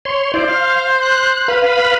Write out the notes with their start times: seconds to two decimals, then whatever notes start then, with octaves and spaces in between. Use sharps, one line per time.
0.05 C#5 C6
0.34 E4 C5 D5
0.48 F5
1.02 F#6
1.48 B4 F5 B5